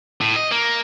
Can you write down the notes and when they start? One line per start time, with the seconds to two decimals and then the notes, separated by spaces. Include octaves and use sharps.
0.21 A2
0.36 D#5
0.52 A#3